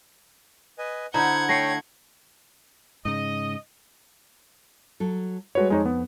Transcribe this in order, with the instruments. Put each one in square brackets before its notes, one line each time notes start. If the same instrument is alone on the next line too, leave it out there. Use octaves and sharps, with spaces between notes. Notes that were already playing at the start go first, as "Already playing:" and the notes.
[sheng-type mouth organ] B4 D#5 G#5
[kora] D3 D#4 E4 [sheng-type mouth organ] C5 [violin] F#5 G#6 [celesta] A#5
[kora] A3 [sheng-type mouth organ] C#5 G5 [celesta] A#6 C7 C#7
[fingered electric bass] G#2 C#3 [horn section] D#5
[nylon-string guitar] F#3 A4
[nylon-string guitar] G3 A4 B4 [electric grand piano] G#3 F#4 C#5
[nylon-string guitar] F2 [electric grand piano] G#3 D#4 C#5
[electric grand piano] B3